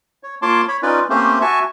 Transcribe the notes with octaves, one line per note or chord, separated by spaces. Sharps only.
C#5
A#3 F4 C#5 A5 C6 D6
C#5 B5
C#4 D#4 F4 B4 D5
A3 A#3 C4 C#4 G4 C5
F#4 E5 G#5 A5 C#6